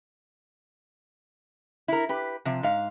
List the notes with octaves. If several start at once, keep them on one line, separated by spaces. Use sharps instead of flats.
E4 A#4
G4 B4
C3 F3
G#2 F5